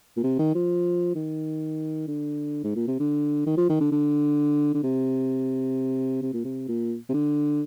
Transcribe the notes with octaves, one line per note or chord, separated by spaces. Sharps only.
A#2
C3
D#3
F3
D#3
D3
G#2
A#2
C3
D3
D#3
F3
D#3
D3
D3
D3
C3
C3
A#2
C3
A#2
C3
D3